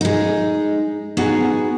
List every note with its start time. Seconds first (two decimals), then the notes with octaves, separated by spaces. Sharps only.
0.01 G#3 D#4
1.17 B3 D#4 F#4 G#4